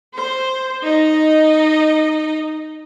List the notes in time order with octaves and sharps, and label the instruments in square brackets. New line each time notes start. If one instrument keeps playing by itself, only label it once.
[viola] C5
D#4 D#5